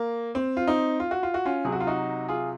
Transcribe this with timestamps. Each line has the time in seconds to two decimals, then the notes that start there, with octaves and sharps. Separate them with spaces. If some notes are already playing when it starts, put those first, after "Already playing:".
Already playing: A#3
0.35 C4
0.57 F4
0.67 C4 D#4
1.00 F4
1.11 F#4
1.23 F4
1.34 F#4
1.45 C#4 F4
1.65 C3 F#3 G#4
1.72 F#4
1.80 F4
1.87 D#4 F#4
2.29 F4 G#4